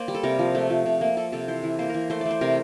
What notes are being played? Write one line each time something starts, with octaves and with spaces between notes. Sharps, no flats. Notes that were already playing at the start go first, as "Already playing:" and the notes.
Already playing: A#3 C5 D5
G3
A4
C3 A#4
F3
A3
F3
C3
A#3
A#3 A4
C3 A4
E3 C5
E3
A#3 C5
E3 A#4
A3 C5
A3 D5
C5
C3 A#4